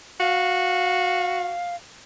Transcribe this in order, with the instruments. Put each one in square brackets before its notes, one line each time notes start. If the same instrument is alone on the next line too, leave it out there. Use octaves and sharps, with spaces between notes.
[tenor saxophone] F#4 [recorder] F5